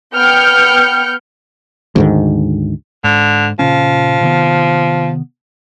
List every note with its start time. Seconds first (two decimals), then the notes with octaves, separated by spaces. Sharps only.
0.13 B3 G5 F6 G6 C#7
1.96 D2 G#2 D#3
3.04 G#2 D3
3.59 A#2 C#3 F3 C#4
4.21 C3 D#3 B3